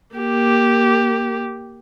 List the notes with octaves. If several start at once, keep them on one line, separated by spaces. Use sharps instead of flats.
A#3 G4